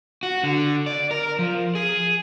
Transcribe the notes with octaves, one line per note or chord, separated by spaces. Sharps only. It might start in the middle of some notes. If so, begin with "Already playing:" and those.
F#4
D3
D5
A#4
F3
G#4